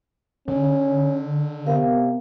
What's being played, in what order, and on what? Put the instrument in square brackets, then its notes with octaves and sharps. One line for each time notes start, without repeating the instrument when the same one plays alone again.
[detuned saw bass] D3 [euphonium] C#4
[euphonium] C3 [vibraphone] B3 A#4 F5